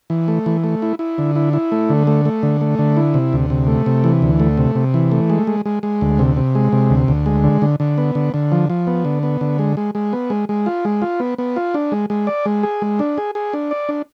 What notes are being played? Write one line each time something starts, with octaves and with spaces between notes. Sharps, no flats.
E3
A3
E3
A3
E4
E4
D3
E4
E4
A3
D3
A3
A3
D3
A3
D3
E4
C3
D2
C3
A3
C3
E3
D2
A3
C3
C3
E3
A3
G#3
G#3
G#3
G#3
D2
C3
C3
G#3
C3
D2
D2
G#3
D3
D3
D3
B3
D3
D3
F3
F3
B3
D3
B3
D3
G#3
G#3
G#3
B3
G#3
G#3
F4
G#3
F4
B3
B3
F4
D4
G#3
G#3
D5
G#3
G#4
G#3
D4
G#4
G#4
D4
D5
D4